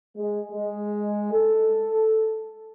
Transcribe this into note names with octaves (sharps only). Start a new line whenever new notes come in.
G#3
G#3
A4